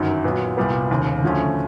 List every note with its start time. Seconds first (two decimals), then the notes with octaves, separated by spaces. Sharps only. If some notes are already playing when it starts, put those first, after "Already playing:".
Already playing: G1 F#2 D#3 F#3
0.24 A#2 F#3 B3
0.57 C2 A#2 G3 B3
0.90 F1 D#2 C#3
1.22 D2 D3 F3 A3 C#4